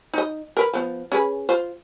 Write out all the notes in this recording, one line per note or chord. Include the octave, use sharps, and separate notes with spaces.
D#4 D#5
A#4 B4
F3 B3
C#4 G#4 B4
F4 C5